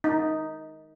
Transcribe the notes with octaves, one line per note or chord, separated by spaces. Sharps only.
D#4